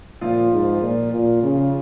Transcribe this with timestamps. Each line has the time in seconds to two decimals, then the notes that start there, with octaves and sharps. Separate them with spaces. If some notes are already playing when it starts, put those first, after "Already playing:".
0.21 A#2 F3 F4
0.52 G#2
0.81 A#2
1.12 A#2
1.42 C#3